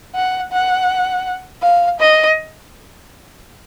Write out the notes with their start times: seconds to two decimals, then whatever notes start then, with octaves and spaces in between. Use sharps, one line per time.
0.15 F#5
0.52 F#5
1.62 F5
2.00 D#5